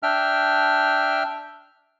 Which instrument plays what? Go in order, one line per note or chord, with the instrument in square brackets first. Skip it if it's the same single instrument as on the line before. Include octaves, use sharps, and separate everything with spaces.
[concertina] D4 E5 G5 F6